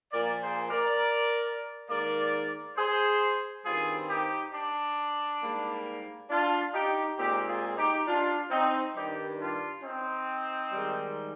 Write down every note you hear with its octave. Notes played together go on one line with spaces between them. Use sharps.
A#2 F3 A#3 A#4 D5
G#4 C5
A#4 D5
G#2 D#3 A#3 A#4 D5
G#4 C5
G2 D#3 G3 C4 F4 G#4
D#4 G4
D4
G#2 G3 A#3
D4 F4
D#4 G4
A#2 G#3 C4 D#4 G4
F4 G#4
D#4 G4
D4 F4
C4 D#4
G2 D#3 G3 D#4 G4
D4 F4
C4 D#4
G#2 D#3 G3